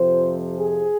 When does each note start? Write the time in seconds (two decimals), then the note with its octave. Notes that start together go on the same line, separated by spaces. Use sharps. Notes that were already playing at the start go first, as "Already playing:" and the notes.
Already playing: F2 C3 F3 C5
0.59 G#4